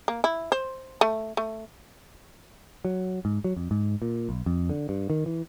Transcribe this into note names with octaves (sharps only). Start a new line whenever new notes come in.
A#3
E4
C5
A3
A3
F#3
G#2
F#3
F2
G#2
A#2
B1
F2
D3
G2
D#3
E3